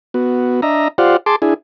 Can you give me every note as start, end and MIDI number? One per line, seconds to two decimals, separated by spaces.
0.14 0.61 59
0.14 0.61 66
0.62 0.88 62
0.62 0.88 75
0.62 0.88 76
0.62 0.88 82
0.98 1.17 65
0.98 1.17 67
0.98 1.17 72
0.98 1.17 74
0.98 1.17 77
0.98 1.17 78
1.26 1.36 68
1.26 1.36 81
1.26 1.36 84
1.26 1.36 86
1.42 1.54 62
1.42 1.54 64
1.42 1.54 68